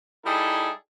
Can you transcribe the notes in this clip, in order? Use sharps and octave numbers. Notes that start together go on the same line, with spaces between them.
G3 D#4 E4 G#4 A4